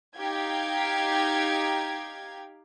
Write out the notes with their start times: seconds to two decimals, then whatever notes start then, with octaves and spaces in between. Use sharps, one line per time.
0.17 D#4 G4 F5 G5 G#6